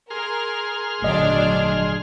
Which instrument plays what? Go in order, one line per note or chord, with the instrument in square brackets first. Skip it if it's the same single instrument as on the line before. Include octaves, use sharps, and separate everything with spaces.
[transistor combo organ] G#4 C6 F6 [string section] A#4
[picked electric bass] G#1 A#2 D3 [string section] F#3 D4 [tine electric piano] A3 D#5